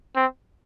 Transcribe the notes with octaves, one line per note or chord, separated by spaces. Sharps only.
C4